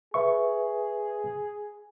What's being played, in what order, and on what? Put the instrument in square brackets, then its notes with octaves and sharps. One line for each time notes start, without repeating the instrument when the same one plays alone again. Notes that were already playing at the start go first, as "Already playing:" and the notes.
[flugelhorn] G#4 [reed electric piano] B4 E5 C#6